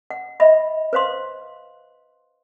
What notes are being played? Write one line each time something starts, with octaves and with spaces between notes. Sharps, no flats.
F#5
D#5 E5 B5
B4 C5 F5 C6